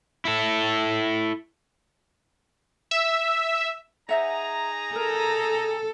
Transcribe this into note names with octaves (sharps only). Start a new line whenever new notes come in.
E4 A4
E5
D#4 G#4 C5 E5 F#5 A#5
A4 A#4